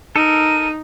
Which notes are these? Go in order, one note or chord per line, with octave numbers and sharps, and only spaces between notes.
D#4 A4 A#4 D#7